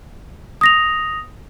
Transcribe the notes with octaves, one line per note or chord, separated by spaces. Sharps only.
D#6 A#6 F7